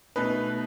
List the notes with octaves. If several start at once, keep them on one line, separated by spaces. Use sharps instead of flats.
B2 A3 D#4 B4